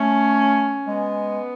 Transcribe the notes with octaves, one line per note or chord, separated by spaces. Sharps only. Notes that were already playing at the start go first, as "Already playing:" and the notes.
Already playing: A3 C#4
G#3 B3